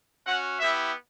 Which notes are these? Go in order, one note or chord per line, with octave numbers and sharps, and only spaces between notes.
C#4 F#4 F#5
B3 E4 G4 E5